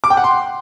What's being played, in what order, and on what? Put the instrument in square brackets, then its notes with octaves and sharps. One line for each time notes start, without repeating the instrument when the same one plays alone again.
[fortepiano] D6
G5
F#5
C6